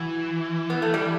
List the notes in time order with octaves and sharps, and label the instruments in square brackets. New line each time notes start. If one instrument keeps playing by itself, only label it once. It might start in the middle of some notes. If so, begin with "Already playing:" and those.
Already playing: [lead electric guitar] E3 [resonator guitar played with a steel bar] F#4
[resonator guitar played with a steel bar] B3
A3
G3